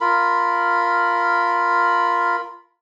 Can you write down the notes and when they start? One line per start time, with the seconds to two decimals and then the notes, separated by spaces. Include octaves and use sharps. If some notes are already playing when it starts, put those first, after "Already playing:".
0.01 F4 A#4 B5